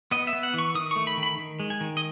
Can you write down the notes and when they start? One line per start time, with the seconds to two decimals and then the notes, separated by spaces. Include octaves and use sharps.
0.11 B3 D#5
0.27 E5
0.33 B3
0.43 F#5
0.54 E3 C#6
0.75 D#3 D#6
0.91 A3 C#6
1.07 B5
1.17 D#3
1.23 B5
1.37 D#3
1.60 G#3
1.70 G#5
1.81 D#3
1.97 D#5